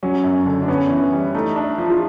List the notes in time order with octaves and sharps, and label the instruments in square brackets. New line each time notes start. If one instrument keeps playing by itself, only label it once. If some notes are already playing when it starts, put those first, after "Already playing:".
[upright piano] F#3 [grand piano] C#4
[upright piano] F#2
D3
[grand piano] D4
[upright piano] B3 [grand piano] C#4
[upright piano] E3
G3
[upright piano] A3 [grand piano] D#4
[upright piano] D4
F3
[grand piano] F4